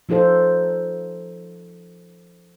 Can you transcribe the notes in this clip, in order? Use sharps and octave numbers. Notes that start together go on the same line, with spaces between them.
F3 D#4 F4 A4 C5